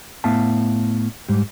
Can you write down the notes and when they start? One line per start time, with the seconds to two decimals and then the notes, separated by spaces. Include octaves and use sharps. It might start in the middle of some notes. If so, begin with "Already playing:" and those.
0.24 A2 B3 E5 F5 A5
1.29 G#2 G3